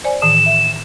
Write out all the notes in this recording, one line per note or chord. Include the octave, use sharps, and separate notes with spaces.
C5 D5 G#5
A2 D#3 E3 E7
E5